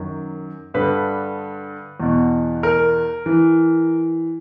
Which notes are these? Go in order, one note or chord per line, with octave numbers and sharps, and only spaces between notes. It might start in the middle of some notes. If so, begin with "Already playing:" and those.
Already playing: F#2 D#3
G2 D3 B4
E2 B2
A#4
E3